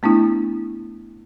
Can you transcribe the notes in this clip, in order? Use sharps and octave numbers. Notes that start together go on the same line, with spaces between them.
A3 B3 D4 E4